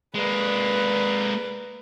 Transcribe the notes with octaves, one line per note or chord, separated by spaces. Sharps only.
G#3 A#3 B4 D5